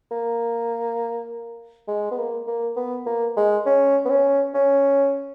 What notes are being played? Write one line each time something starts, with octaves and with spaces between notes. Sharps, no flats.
A#3
G#3
B3
A#3
A#3
B3
A#3
G#3
C#4
B3
C#4
C#4